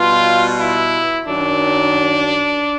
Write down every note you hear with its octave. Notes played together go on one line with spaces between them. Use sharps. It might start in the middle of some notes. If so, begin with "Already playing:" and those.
Already playing: B2 G3 F4
E4
F#2 D#3 F#3 D4